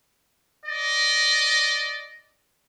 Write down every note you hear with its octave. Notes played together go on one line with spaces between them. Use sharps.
D5 D#5